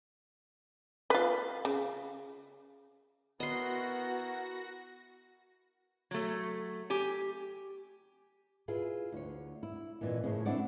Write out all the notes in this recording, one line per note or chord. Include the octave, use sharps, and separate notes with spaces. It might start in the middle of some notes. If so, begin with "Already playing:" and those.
F4 B4
C#3
B3 E4 F#4 A#4 D#5 C6 A#6
F#3 A3
G4 G#5
E4 F4 G#4 B4
D2 C#5
E4
F2 A#2 E3
A2 C#3 F3 G#4
C4 D4 E4 C#5 D5 F#5